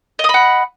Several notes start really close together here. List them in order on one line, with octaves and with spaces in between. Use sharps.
D#5 D#6 B5 F#5